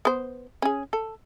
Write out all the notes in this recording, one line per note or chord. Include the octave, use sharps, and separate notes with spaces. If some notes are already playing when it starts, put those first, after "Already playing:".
B3 C5
C#4 G#4
A4